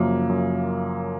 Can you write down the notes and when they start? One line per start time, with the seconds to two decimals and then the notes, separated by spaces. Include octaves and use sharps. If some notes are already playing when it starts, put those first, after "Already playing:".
Already playing: F#2 C#3 F3 A#3
0.29 F#2